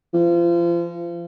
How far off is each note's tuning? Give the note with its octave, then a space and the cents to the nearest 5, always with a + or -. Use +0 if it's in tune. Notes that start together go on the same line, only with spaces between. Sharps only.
F3 -30